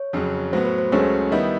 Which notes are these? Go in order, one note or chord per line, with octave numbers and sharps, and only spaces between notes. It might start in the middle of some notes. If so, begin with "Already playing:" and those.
Already playing: C#5
F2 C#3 F#3
A2 F#3 B3 C5
B4
C5
C#2 C#3 F#3 A3 C#4 C#5
D#3 G3 B3 E4 D#5